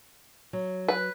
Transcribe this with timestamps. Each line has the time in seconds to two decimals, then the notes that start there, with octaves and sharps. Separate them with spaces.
0.53 F#3
0.88 B4